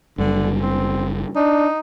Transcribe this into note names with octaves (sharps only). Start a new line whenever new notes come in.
F#1 F#2 D3 G3
C4
D4 D#4